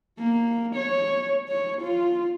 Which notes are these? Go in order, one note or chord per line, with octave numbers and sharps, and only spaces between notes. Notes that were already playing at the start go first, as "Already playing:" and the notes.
A#3
C#5
C#5
F4